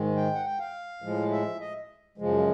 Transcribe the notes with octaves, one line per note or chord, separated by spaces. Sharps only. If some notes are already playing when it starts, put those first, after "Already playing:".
Already playing: G#2 D#3 G#3
G5
F#5
G5
F5
A2 F3 G#3
E5
D#5
F#2 C#3 F3 G#3